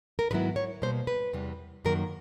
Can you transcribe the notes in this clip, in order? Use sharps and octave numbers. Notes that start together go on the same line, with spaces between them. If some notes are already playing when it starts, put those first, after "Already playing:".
A#4
G#2 D#3 F#3 B3 E4 B4
C#5
B2 G3 A#3 C5
B4
E2 C3 E3 G3
F#2 D#3 F#3 A#3 A#4